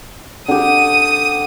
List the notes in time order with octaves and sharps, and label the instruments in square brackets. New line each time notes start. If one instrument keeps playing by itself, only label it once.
[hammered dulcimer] D3 G4 [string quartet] D#6